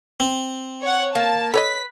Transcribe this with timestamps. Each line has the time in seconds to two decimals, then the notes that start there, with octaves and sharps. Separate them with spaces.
0.20 C4
0.81 C#5 F#5
1.15 A#3 A5
1.54 A4 B4 C#5 D#5 B6